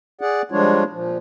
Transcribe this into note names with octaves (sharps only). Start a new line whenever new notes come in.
G#4 D5 F#5
F3 G3 G#3 D4 F4 C#5
A#2 F3